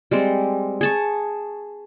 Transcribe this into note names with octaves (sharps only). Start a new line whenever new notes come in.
G3 G#3 C4
G#4 A5 C#6